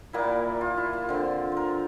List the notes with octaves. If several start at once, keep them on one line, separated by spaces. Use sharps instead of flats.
A#2 G3 A#3 E4
F4
E4
F4
D3 F3 C4
A#4 C5